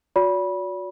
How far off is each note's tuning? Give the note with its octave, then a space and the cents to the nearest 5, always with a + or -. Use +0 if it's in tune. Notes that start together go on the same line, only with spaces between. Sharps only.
F#4 -30 D5 -45 B5 -20